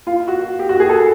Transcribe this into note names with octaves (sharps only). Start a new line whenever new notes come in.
F4
F#4
G4
F#4
G#4
A4